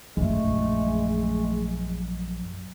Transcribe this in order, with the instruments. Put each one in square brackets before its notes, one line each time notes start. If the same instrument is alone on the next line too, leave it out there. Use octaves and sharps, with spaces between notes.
[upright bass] A#1 F#2 [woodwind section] G#3 A3